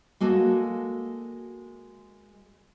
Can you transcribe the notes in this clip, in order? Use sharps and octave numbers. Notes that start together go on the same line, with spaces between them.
G#3 A#3 F#4 A4